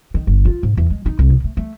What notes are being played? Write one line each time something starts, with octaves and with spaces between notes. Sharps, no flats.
D#3
G1
F4
G#2
E2
G#3
D#4
C2
B2
A3
A3